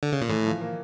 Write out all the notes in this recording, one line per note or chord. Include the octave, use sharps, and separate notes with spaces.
D3
C#3
A#2
A2 E3
F3
A#3